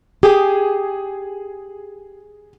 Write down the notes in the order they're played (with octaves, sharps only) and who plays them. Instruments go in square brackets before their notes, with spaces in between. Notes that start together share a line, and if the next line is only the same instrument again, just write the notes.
[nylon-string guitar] G4 [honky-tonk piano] G#4